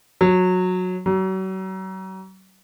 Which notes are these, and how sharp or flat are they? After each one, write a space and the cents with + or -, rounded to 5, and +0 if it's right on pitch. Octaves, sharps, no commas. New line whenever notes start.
F#3 -15
F#3 +40